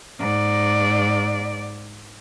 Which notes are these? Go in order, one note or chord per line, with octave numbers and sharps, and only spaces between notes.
G#2 D5